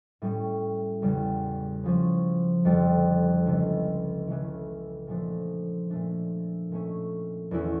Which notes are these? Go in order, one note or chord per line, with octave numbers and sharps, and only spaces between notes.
A2 G3 C#4
E2 C#3 G3
C#3 F3 C#4
F2 D3 G3 D4
C#2 C#3 E3 A3
C#3 E3 A3 E4
A#2 F3 A3 D4
A#2 A3 D4
A#2 A3 C#4
E2 E3 A3 C#4 E4